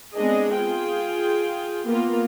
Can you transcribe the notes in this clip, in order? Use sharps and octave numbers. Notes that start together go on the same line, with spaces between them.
G#3 B3 C4 D4 G#4 D#5
F4 G#4 G5
A#3 B3 F4